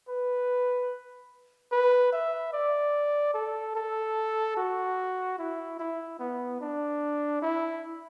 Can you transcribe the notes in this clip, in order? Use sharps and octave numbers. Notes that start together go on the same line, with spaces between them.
B4
B4
E5
D5
A4
A4
F#4
E4
E4
B3
D4
E4